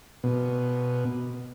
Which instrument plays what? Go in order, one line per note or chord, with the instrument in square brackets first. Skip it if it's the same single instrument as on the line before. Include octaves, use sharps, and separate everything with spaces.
[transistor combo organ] B2